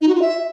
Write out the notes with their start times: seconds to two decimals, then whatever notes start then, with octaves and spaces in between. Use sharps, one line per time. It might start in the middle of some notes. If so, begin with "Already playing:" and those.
0.01 D#4
0.08 F#4
0.15 F4
0.21 E5